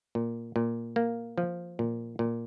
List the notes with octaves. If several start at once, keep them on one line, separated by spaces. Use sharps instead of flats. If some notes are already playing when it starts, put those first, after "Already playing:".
A#2
A#2
A#3
F3
A#2
A#2